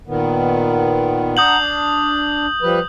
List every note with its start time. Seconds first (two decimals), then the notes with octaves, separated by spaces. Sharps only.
0.07 A#2 D#3 B3
1.37 D4 F#5 A#5 D#6 G6 F#7
1.58 D4
2.62 F3 G3 B4